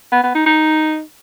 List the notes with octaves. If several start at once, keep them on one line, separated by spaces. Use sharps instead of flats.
B3
B3
D#4
D#4